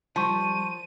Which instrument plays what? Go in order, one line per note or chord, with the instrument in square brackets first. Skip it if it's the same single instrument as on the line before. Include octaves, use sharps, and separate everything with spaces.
[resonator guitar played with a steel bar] F3 [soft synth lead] G3 [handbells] A5 C#6 [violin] D#7